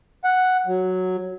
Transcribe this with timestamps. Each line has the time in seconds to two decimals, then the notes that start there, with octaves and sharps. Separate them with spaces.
0.24 F#5
0.66 F#3